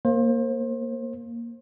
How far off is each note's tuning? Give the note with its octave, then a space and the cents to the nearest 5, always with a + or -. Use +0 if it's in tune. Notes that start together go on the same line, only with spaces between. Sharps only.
A#3 +0 C5 +30